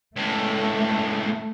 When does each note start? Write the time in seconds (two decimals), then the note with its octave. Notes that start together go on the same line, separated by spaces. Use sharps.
0.16 C#2 A2 A3